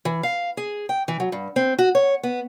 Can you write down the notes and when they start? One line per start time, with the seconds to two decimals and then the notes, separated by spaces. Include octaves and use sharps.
0.05 E3
0.23 F5
0.57 G#4
0.89 G5
1.08 E3
1.20 F#3
1.32 G2
1.56 C4
1.79 F#4
1.95 C#5
2.23 B3